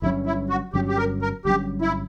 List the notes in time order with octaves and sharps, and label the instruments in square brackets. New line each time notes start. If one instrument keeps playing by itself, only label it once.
[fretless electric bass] G1 G2 F#3 C#4 [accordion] E4
[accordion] E4
F#4
[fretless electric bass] G1 G2 F#3 C#4 [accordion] G4
[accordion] G4
A#4
A#4
[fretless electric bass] G1 G2 F#3 C#4 [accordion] G4
[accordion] E4